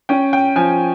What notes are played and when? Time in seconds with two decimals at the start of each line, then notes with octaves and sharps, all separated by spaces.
0.09 C#4 G5
0.33 G5
0.56 F3 G#5